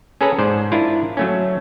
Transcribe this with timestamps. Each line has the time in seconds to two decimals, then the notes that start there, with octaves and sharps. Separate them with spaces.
0.21 C#4 G#4 A4 B4 A#5
0.38 G#2 C5 D5
0.72 D4 E4 F4 A#4
1.17 F#3 A3 C#4